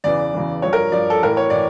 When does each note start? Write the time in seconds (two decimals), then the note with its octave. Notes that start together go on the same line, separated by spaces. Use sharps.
0.04 E2 C#3 E3 D5
0.34 E2 C#3 E3
0.62 G2 F3 C#5
0.73 A#4
0.92 G2 F3 D5
1.10 A4
1.22 A2 E3 A#4
1.37 C#5
1.50 A2 E3 D5